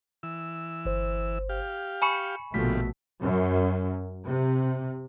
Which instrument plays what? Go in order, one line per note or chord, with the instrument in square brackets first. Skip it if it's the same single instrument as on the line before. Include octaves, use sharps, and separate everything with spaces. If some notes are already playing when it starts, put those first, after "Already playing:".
[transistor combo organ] E3 E6
[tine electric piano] G1 C5
[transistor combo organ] G4 F5
[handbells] G#5 B5 C#6 [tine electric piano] C#7
[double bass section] A#1 B2 A3 [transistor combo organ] D3 F3 G3 [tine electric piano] B6
[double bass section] F#2
C3